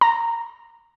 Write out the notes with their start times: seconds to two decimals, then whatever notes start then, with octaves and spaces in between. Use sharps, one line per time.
0.01 A#5